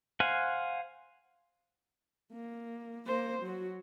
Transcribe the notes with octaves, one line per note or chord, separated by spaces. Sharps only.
C5 F5 F#5 G#5
A#3
A#3 C5
F#3 F#4